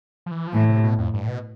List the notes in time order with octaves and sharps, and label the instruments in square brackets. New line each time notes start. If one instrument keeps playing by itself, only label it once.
[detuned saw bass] F3
E3
F3
[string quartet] A2 [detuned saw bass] E3
[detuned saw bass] C3
B2
F2
G2
A2
B2